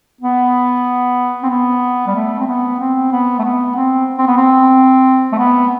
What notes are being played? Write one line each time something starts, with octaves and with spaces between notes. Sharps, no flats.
B3
C4
B3
G3
A3
C4
B3
C4
B3
A3
B3
C4
C4
B3
C4
A3
B3